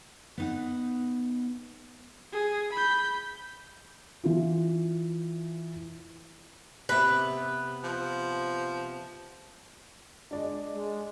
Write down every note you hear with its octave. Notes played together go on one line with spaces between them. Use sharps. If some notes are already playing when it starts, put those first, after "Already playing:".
B3 D#4 F#5
G#4
B5 G6
E3 F4
C3 B3 B4
F3
G#3 D4 D5 D#5
G#3